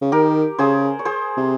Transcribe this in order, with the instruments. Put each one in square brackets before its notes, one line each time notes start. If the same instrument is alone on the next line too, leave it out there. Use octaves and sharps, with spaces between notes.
[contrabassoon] C#3
[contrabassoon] D#3 [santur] G4 A#4
[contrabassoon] C#3 [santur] G#4 C5
[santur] C#5
G#4 C5
[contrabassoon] C3